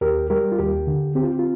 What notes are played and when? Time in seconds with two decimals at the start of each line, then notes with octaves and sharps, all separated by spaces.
0.01 D#2 G4 A#4
0.30 G3 G4 A#4
0.52 F4
0.59 D#2 G4
0.87 D3
1.15 C4 G4
1.23 F4
1.39 F4